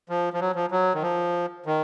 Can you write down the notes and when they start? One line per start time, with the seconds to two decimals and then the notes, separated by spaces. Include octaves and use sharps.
0.09 F3
0.33 F3
0.41 F#3
0.55 F3
0.71 F#3
0.94 D#3
1.02 F3
1.66 D#3